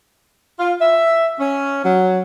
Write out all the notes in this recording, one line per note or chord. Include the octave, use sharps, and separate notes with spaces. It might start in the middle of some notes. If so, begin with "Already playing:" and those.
F4
E5
C#4
F#3